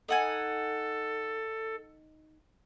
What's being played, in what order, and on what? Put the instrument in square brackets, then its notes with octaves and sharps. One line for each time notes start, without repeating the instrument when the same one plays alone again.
[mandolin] D#4 F#5 G#5 [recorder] A4